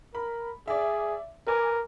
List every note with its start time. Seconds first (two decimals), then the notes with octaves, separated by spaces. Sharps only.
0.15 A#4 B5
0.68 G#4 D5 E5
1.47 A#4 B4 G#5 D6